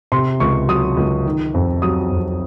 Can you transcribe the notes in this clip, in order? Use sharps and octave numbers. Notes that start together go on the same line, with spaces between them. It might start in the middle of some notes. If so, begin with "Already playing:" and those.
C3 C6
C#2 C#6
F#3 D#6
C#2
D#3
F2
F#3 D#6
F2